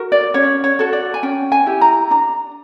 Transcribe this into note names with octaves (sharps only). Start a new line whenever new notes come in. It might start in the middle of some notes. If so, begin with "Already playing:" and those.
Already playing: F#4 A#4
D5
C#4 C#5
C#5
F#4 A4
D5
G#5
C#4 G5
G#5
E4 G4
A#5
D4 A#5